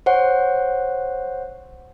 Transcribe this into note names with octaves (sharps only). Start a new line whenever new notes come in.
C5 C#5 F#5